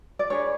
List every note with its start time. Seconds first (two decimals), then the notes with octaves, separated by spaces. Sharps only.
0.19 D5
0.30 D4 G#4 B4 C#5